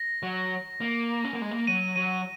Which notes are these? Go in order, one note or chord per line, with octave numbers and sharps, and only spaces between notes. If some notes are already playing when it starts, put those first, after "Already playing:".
Already playing: A#6
F#3
A#3
C#4
A#3
G#3
A#3
F#3 D#7
F#3 D#7